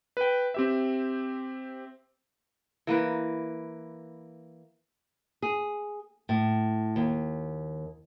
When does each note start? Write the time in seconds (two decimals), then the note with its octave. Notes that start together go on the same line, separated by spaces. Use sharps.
0.17 B4 G5
0.54 C4 G4 E5
2.87 E3 A#3 B4
5.42 G#4
6.29 A2
6.96 D#2